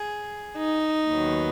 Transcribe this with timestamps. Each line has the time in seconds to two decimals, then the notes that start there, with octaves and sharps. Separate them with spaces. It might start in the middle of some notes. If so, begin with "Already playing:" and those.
Already playing: G#4
0.56 D#4
1.09 D#2 D#3 F#3 B3